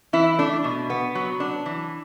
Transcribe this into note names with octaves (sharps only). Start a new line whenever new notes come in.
E3 E4
A3 D4
B2
B3
F#3
D4
E3